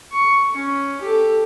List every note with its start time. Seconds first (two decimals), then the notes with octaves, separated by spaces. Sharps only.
0.12 C#6
0.56 C#4
1.01 G4 A4